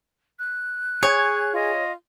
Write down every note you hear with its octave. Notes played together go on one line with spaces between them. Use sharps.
F#6
G#4 C#5 G#5
F4 D#5